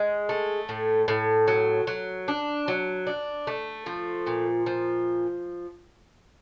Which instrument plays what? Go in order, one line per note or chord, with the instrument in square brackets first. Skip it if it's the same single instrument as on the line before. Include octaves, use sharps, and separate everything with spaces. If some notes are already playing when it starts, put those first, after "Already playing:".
Already playing: [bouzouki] G#3
A3
A2
A2
F#3
F#3
D4
F#3
D4
A3
F3
A#2
F3